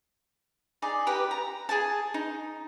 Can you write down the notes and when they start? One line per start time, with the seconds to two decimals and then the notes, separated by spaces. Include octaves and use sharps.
0.82 D#4 G#4 D5
1.07 G4 B4 A#5
1.31 A#5
1.69 G#4 G#5 A5
2.14 D#4